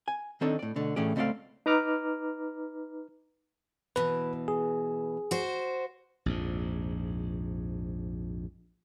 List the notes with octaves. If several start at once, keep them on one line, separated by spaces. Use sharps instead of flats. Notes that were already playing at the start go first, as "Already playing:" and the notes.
G#5
D#3 C4 D4 D#4 A4 C#5
A2 D5
B2 D3 A3
A2 E3 A3 C#4 G#4 D5
C#2 A3 C4 A4 D5 F5
D#4 B4 A#5 D6 F6
B2 E3 B4
G#4
F#4 C5
A#1 F2 G#2